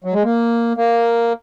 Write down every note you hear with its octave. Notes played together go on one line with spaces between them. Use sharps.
F#3
G#3
A#3
A#3